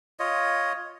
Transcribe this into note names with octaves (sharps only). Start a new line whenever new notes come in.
F4 C#5 D#5